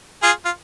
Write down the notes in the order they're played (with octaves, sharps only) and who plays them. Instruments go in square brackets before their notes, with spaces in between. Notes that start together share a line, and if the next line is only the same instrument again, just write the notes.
[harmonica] F4 G#4
F4